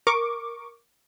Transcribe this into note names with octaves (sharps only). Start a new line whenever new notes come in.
A#4 C#6 D6